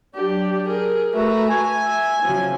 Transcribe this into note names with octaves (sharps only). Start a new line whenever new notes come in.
F#3 D4 G4
G#4 A#4
A3 F#4 B4 E5 A#5
G#5
E5
C#3 F3 F#3